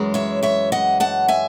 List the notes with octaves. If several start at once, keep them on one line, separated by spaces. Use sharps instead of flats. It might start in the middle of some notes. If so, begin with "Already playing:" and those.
Already playing: F#2 E3 G#3
C#5 E5
C#5 E5
D#5 F#5
F#5 A5
E5 G#5